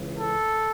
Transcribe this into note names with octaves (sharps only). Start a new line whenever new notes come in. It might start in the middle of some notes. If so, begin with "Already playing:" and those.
Already playing: C#2 C#3 E3
A4